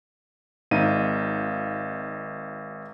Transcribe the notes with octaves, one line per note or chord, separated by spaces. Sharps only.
G#1 D#4 F5 D#7